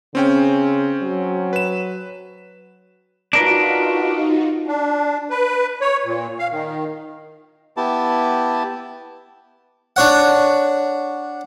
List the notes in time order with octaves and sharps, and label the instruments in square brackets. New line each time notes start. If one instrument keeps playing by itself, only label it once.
[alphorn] C#3 [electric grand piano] C4 C#4 G5
[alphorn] F#3
[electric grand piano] B4 E7
[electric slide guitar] D4 A#4 B4 [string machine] D#4 F4 F#4
[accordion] D4
B4
C#5
A#2
F5
D#3
[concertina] B3 E4 G4 A5
[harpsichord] D4 C#5 F#5